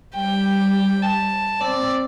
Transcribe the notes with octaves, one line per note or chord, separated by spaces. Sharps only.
G3 G5
A5
C4 D5